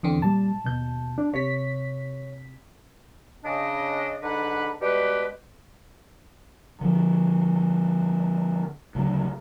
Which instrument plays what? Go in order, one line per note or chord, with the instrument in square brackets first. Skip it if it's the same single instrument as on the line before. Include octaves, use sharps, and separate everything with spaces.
[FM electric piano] E2 D3 C4
[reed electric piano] A#2 G3 [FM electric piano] A5
[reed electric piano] D#2 B2 G6
D4
[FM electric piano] C3 B6 [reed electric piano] C#5
[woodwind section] C#3 D4 D#5
G#2 D3 D4 B4 F#5 B5
B2 G3 G#3 G4 B4
[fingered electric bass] D3 F3
D2 C#3 F#3 A3